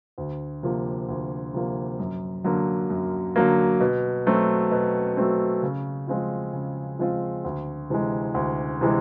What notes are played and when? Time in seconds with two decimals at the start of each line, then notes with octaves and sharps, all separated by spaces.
0.18 D2
0.63 C3 F3 A#3
1.08 D2
1.54 C3 F3 A#3
1.99 F#2
2.44 D3 F#3 A#3
2.90 F#2
3.36 D3 F#3 A#3
3.80 B2
4.26 F#3 A3 C4
4.71 B2
5.17 F#3 A3 C4
5.63 C#3
6.08 F3 G#3 C4 F4
6.53 C#3
6.99 F3 G#3 C4 F4
7.44 D2
7.90 C3 E3 G#3
8.34 D2
8.81 C3 E3 G#3